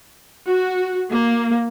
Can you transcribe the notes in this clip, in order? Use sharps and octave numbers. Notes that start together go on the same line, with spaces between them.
F#4
A#3